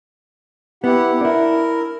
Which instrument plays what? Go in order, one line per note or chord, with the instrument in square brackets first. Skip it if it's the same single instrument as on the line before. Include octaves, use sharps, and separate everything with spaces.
[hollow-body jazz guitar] B3 [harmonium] E4 G4 F#5
[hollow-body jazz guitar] D4 E4 [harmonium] A#4